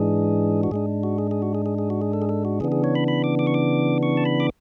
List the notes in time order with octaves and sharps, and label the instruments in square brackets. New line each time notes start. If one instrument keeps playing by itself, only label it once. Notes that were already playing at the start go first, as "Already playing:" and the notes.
Already playing: [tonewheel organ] G#2 E3 G#3 D4 G#4
F#4
G#2 G#3 D4 G#4
F#4
G#4
G#4
F#4
G#4
G#4
G#4
F#4
G#4
A4
G#4
A4
F#4
C#3 E3 B3 D4 G#4
G#4
C#5
B5
B5
D6
D6
C#6
D6
C#6
A5
B5
D6